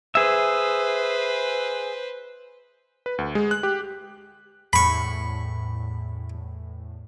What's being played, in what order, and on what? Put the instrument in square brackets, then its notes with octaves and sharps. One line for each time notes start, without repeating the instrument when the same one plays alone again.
[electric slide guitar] G#4 E5 [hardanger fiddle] B4 C5
[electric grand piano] B4
D2
G#3
F#6
G4
[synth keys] E2 A2 [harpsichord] B5 C#6